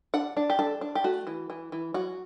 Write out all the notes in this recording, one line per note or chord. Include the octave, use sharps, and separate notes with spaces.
D4 F#5
D4
G4
D4 A4
D4
G4
A3 F#4
E3
E3
E3
F#3 F#4